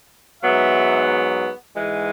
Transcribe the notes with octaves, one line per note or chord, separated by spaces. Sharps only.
G#2 F#3 B3 E5
G#2 E3 G#3